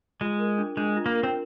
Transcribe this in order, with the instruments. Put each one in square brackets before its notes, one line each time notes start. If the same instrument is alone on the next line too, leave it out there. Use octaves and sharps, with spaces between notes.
[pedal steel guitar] G#3 [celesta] F4
[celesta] A#4
D4
[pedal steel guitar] G#3 [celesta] D4
[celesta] F4
[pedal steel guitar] A#3
[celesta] A#4
[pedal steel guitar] C4